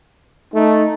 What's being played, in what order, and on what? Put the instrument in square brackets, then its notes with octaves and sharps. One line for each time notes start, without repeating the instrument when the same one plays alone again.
[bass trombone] A3 [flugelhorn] D#4